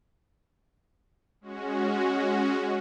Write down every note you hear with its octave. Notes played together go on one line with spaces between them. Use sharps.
G#3 C#4 F#4